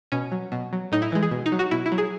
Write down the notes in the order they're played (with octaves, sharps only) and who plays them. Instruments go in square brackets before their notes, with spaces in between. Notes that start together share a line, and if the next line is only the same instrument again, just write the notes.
[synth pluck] B2 C#4
F#3
B2
F#3
A2 D#4
E4
E3 G#3
G#4
B2
D#4
F#3
F#4
B2 E4
E4
F#3
G#4